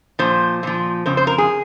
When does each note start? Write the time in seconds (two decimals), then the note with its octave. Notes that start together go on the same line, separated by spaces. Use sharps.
0.19 A#2 F3 C5
0.63 A#2 F3
1.06 F2 C#3 C5
1.17 C5
1.27 A#4
1.38 G#4